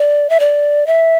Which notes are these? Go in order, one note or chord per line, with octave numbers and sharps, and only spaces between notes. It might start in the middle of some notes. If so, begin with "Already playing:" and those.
Already playing: D5
E5
D5
E5